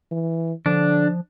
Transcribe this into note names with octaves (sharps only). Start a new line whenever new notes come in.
E3
D3 F3 D4